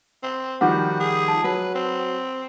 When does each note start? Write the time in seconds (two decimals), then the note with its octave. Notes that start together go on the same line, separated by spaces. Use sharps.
0.23 C4
0.61 D#3 F3 G3 F#4 F#5 D6
1.00 G#4
1.28 A5
1.44 F#3 B4
1.75 C4